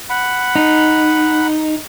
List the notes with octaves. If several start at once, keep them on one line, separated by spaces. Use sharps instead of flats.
F#5 B5
D#4